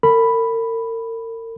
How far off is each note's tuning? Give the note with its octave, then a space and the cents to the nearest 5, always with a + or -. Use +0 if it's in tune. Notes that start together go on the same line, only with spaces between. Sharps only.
A#4 -40 B5 +0